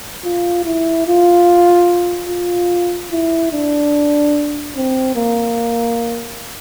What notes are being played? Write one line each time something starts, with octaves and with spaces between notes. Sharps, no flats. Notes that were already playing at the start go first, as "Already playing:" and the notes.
F4
E4
F4
F4
E4
D4
C4
A#3